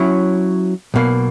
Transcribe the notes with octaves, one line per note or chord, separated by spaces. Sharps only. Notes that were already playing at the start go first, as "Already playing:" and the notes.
Already playing: F#3 C#4 E4
B1 B2 A#3